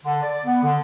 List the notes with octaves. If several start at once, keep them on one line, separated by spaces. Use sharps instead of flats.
D3
D5
B3
D3